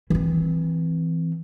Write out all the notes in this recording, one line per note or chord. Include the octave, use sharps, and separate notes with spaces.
E3 C4